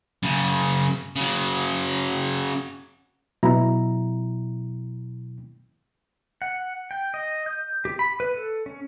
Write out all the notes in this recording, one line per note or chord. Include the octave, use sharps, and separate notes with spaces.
F#2 C#3
C#3 F#3
B2 F#3 E4 A#5
F#5
G5
D#5
G6
G4
B5
B4
A4
C#4